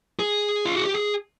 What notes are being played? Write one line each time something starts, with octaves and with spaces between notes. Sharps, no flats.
G#4
F4
F#4
G4
G#4